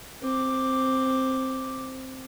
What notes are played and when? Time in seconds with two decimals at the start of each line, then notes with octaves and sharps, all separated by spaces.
0.22 C4 D6